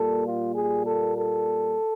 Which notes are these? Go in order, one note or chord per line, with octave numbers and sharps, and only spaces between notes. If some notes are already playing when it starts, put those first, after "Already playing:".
Already playing: A#2 G3 A#3 A4
F4
G#4
A4
A4